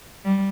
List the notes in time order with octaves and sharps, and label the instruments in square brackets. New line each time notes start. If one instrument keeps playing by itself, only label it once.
[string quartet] G3